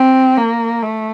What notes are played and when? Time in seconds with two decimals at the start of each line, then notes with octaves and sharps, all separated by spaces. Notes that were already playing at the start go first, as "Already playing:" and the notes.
Already playing: C4
0.38 A#3
0.82 A3